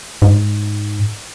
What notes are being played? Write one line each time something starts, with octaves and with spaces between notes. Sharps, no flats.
G#2